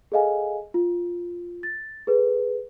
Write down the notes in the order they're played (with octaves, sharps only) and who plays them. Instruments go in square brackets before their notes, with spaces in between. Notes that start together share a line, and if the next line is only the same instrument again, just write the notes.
[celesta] G#4 A4 D#5 F5 G#5
F4
A6
G#4 A4 B4